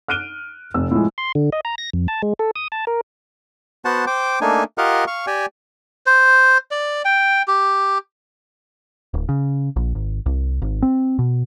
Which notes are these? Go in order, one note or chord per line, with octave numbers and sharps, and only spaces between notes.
F6 F#6 D7 D#7 G7
F1 E6
A2 F3 G#3
C6
D3
D#5
A#5
A#6
F2
A5
G#3
A4
D#6
A5
A#4
B3 F#4 C5 F#5 A5
C5 G5 D6
A3 A#3 D4 D#4 G#5
F4 G4 A#4 D#5 F5 F#5
F5 C#6
G4 D5 G5 G#5
C5
D5
G5
G4
D1
C#3
A#1
G#1
C2
G#1
C4
B2